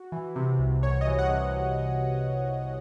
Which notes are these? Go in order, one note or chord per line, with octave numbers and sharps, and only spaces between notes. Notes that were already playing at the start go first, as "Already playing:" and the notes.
Already playing: F#4
E3
C3
C2
C2 C#5
D#5
E3
F#5
C3